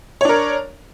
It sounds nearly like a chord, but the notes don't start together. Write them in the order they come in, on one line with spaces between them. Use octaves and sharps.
C#5 D4 A#4